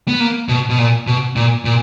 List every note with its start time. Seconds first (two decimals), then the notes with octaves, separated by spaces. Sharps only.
0.08 B3
0.20 A#3
0.49 B2
0.69 B2
0.78 A#2
1.07 B2
1.36 A#2
1.65 A#2